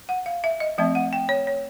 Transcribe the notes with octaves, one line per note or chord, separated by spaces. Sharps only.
F#5
F5
E5
D#5
F3 A3 C4 E5
F#5
G5
C#5
C#5